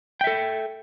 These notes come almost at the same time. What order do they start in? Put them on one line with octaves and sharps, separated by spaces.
G5 E5 A4